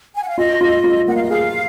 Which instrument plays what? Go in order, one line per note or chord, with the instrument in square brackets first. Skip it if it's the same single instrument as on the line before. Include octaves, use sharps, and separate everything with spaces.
[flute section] G#5
F#5
F5
[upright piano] F4 [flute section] D#5
[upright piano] F4
F4
[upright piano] A#3 [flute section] F#5
[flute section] F5
D#5
[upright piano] G#4 [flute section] F5